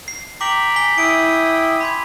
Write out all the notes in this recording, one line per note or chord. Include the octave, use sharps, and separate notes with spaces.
C7
G5 A#5 D6 B6 F#7
G#5 B6 G7
E4 G5 D#6 D7
B5 C6 G#6